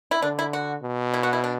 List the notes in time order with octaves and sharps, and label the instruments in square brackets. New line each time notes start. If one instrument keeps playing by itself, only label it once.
[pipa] E4
[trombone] D3 [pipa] D4
[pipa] E4
F#4
[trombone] B2
[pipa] E4
F#4
E4
D4